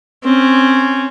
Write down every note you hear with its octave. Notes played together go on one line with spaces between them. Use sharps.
C4 C#4